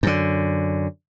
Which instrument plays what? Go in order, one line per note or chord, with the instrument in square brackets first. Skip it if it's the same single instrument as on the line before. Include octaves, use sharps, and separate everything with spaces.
[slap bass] F#2 D3